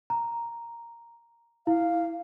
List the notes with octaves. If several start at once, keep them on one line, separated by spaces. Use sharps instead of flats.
A#5
E4 F5